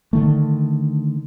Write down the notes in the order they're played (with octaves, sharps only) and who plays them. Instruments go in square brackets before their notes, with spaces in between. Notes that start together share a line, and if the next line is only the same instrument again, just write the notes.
[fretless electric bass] D3 D#3 A3